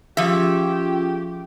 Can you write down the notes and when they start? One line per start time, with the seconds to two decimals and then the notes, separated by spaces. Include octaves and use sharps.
0.17 F3 C#4 F4 G4 G#4 E5